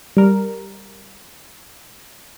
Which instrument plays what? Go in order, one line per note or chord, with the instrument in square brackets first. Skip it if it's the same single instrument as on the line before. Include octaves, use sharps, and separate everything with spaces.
[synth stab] G3 A#4